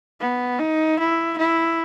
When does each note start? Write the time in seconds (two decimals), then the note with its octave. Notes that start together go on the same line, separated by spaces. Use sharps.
0.20 B3
0.60 D#4
0.99 E4
1.38 E4